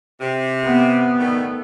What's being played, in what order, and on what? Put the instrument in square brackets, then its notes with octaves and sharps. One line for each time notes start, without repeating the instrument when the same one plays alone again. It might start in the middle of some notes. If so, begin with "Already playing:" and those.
[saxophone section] C3
[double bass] B3
[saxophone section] D#3 G3 A3